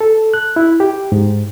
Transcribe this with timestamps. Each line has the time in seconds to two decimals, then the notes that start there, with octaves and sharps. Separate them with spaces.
0.01 A4
0.34 F#6
0.56 E4
0.80 G4
1.12 G#2